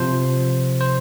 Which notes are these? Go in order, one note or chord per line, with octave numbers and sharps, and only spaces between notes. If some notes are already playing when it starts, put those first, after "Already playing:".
Already playing: C3 F3 C5
C5